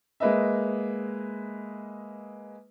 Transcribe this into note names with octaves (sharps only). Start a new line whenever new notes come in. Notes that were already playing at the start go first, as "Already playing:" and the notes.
G#3 A#3 B4 D#5 E5